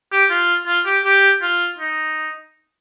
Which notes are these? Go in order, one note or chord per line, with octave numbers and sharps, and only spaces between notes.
G4
F4
F4
G4
G4
F4
D#4